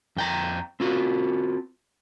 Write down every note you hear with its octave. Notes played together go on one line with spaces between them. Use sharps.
F2 G5 A#5
C4 F4 F#4